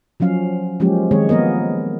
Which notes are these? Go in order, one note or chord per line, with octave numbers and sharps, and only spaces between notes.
F3 F#3 C#4 F5
F3 F#3 G#3 A#3 C#4 G4
D#3 G#3 C4 G#4 C#5
F3 A#3 B3 A#4 D#5